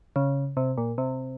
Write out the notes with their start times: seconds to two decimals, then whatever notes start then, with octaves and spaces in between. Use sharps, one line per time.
0.16 C#3
0.57 C3
0.78 A#2
0.98 C3